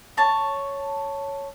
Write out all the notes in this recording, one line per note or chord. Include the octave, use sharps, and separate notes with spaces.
C#5 A5